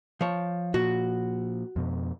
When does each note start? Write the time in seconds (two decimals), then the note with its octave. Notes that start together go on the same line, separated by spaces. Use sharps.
0.21 F3 C#5
0.74 A#2 F3 F#4
1.76 F2 B2